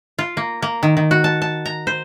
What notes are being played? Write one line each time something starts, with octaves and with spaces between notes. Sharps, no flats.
F4
A#3
A#3
D#3
D#3
F#4
A5
A5
A#5
C5